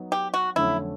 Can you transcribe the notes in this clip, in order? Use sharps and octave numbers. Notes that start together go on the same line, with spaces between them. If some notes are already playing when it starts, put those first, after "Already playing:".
Already playing: F#3 B3 D#4
G4
F#4
F2 D3 F#3 A3 C#4 E4